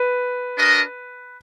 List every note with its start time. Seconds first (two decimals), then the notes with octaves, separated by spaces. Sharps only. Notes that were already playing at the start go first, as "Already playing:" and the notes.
Already playing: B4
0.57 D4 F#4 A#4 D#5